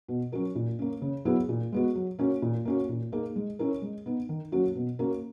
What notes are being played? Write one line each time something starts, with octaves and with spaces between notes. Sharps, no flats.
B2
F#3 C#4 F#4 A#4
A#2
A#3 C#4
C#3
F#3 B3 E4 G#4
A#2
G#3 B3 F#4
F#3
A#3 C#4 F#4
A#2
A#3 C#4 F#4
A#2
A#3 D#4 G#4
G#3
C#4 E4 A#4
G#3
B3 D#4
D#3
F#3 A#3 C#4 F#4
B2
A#3 C#4 F#4 A#4